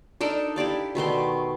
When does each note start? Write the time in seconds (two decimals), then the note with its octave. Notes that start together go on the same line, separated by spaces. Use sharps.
0.21 D4 D#4 A4 A#4
0.56 E4 G4 D5 F5
0.95 B2 D#3 A3 C6